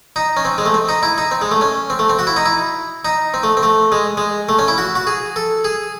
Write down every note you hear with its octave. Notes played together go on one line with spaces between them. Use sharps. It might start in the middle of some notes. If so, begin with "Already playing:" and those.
D#4
C#4
C4
G#3
A3
C4
D#4
E4
D#4
C4
G#3
A3
C#4
C4
A3
C4
F#4
E4
D#4
E4
D#4
C4
A3
C4
A3
G#3
G#3
A3
C#4
E4
F#4
F#4
G#4
A4
G#4